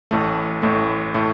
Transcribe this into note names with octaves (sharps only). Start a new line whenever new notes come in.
A1 A2 A3
A1 A2 A3
A2 A3